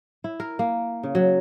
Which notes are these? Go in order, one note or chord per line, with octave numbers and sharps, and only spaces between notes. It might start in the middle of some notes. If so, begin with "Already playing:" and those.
E4
A#4
A#3
C#3
F#3